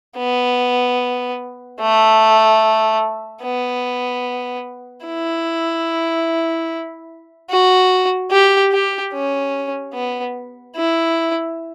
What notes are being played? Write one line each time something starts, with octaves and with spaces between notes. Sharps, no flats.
B3
A3
B3
E4
F#4
G4
G4
C#4
B3
E4